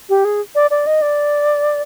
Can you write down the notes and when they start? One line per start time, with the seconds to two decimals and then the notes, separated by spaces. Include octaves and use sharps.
0.09 G4
0.25 G#4
0.55 D5
0.71 D5
0.87 D#5
1.02 D5